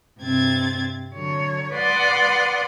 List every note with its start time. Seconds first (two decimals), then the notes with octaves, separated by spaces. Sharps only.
0.20 G2 C3 G3 C4 G#6 A6
1.14 D3 F#3 C#5
1.73 B4 D5 F#5 C6 D6 D#6